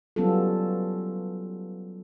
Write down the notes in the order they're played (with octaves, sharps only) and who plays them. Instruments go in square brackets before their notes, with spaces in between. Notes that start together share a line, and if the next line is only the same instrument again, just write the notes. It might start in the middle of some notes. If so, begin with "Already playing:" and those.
[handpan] F#3 G3 B3 C#4 F4 A4